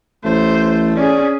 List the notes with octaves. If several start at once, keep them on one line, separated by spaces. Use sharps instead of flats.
A1 A3 C5
C#4 G#4 D5